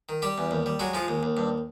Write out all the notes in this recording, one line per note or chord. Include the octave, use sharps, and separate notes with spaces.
D#3
G3 G4
E2
D#2
G3
F#3 G#3 F#4
F3 G#3 F4
D#2
D#2
G2